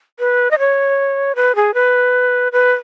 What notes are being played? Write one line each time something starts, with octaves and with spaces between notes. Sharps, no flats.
B4
D#5
C#5
B4
G#4
B4
B4